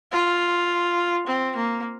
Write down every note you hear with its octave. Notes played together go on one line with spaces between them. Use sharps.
F4
C4
A#3